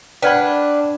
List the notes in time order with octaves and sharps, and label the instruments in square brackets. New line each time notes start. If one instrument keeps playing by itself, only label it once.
[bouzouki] D4 [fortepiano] B4 F#5 B5 [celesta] G5 F6 G#6